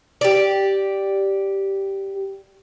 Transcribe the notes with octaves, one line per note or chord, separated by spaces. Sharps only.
G4 D5